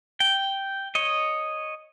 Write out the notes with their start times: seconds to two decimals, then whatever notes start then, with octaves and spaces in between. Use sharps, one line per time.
0.20 G5
0.95 C#5 D#5